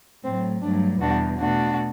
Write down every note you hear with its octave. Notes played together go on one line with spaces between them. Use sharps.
A2 F#3 A3 C4
G2 F#3 A3 D4
E2 B2 G3 D4 F#4
B2 A3 D4 F#4